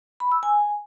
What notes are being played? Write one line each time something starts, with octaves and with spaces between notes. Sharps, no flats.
B5
E6
G#5